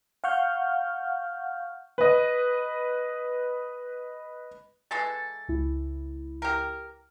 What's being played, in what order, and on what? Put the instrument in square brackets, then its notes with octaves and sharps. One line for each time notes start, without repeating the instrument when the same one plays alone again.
[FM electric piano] F5 F#5 C#6 F6 G6
[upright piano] B4 D#5
[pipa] E3 G#3 A4 [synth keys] A6
[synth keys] C#2 E4
[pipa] G4 A#4